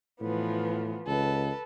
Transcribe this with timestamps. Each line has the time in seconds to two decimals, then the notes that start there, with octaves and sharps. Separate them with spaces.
0.21 A2 E3 F3 B3
1.06 C#2 A4 B4